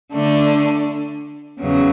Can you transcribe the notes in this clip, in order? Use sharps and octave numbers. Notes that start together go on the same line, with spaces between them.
D3 A3 D4
E2 C#3 F#3